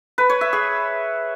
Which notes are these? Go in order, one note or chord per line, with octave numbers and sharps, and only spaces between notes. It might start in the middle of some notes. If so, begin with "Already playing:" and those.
B4
C#5
E5
G#4